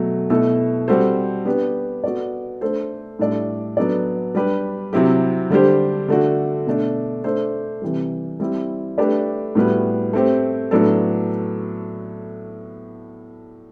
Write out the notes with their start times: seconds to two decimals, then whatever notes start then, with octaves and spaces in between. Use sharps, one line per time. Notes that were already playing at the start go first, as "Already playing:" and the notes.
Already playing: B2 F#3 A3
0.30 B2 A3 E4 A4
0.88 G3 C4 F#4 A4 C5
1.45 B3 D4 G4 B4
2.04 B3 F#4 A4 D5
2.61 A3 D4 A4 C5
3.19 A2 G3 D4 A4 D5
3.77 F#3 B3 D4 A4 D5
4.35 G3 D4 G4 B4
4.93 C3 F#3 C4 E4 G4
5.50 D3 G3 D4 G4 C5
6.09 D3 A3 D4 F#4
6.67 B2 A3 D4
7.24 A3 D4 A4 C5
7.82 C3 E3 G3
8.40 G3 C4 E4
8.98 A3 D4 G4 B4 D5
9.55 A2 G3 B3 F#4 B4
10.13 A3 C4 G4 C5
10.71 A2 F#3 B3 D4 A4